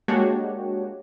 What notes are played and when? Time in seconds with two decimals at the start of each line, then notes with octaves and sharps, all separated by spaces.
0.08 G#3 A#3 D4 F#4 G4 C#5